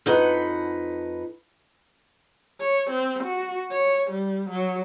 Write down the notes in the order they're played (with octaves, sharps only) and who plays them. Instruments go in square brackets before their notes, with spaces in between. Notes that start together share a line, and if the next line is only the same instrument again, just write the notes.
[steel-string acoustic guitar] F2 D#4 B4 F#5
[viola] C#5
C4
F#4
C#5
G3
F#3